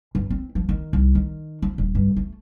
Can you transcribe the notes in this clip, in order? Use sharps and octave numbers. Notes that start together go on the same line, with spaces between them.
G2
C4
F3
D#3
C2
D#3
F3
D#1
G2
A3